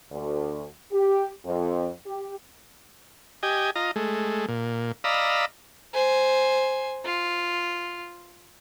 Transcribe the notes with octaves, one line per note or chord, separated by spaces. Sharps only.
D2
G4
F2
G4
G4 D#5 G#5
F4 D#5 A#5
G#3 A3
A#2
D5 D#5 F5 A#5 B5 E6
C5 G#5
F4